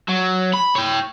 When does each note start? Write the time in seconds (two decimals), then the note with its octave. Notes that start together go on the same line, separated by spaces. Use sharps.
0.08 F#3
0.53 B5
0.75 C#5 G5